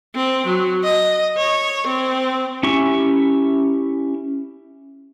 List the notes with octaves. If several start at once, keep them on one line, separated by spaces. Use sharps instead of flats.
C4
F#3
D#5
C#5
C4
C#4 E4 G4 C#6